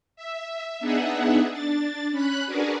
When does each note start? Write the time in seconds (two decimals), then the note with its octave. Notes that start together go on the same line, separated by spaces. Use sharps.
0.16 E5
0.80 B3 D4 D#4 G#4 E5 F#5
1.51 D4 A6
2.11 C#4 B5 F#6
2.46 D4 F#4 G#4 A#4 B4 D5